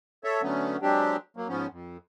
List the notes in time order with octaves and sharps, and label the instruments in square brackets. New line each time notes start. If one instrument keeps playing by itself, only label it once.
[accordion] A4 C#5 E5
D3 F#3 A3 B3 C#4
F#3 G#3 C4 D4 G4
F#3 A#3
G#2 F3 B3 C#4
F2